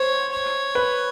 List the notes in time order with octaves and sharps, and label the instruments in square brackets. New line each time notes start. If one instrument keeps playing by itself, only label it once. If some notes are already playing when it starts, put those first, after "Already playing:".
Already playing: [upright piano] C5 [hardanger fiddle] C#5
[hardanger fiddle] C#5
[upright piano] B4